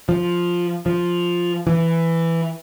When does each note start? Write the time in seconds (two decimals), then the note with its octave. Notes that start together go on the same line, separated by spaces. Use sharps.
0.09 F3
0.86 F3
1.67 E3